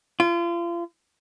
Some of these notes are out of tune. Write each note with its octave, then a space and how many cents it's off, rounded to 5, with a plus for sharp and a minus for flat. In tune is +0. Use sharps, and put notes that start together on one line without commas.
F4 -35